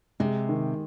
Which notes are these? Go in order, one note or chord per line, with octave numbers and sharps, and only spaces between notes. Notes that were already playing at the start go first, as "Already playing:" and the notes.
C3 G#3
D#3